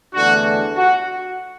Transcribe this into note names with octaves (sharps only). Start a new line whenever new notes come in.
E2 D3 A3 D4 F#4
F#4